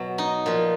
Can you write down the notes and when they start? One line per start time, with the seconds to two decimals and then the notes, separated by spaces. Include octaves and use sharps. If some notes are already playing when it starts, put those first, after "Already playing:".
Already playing: B2 F#3
0.18 D#4
0.46 A#2 F3